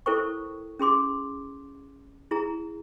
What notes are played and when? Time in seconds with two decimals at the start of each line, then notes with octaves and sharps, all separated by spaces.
0.06 E4 A4 A#4 C5 G5 C#6
0.79 C#4 G#4 C6 D6
2.31 E4 G#4 A#5